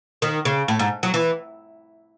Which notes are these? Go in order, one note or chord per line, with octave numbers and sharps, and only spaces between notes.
D#3
C#3
A2
G#2
F#3
E3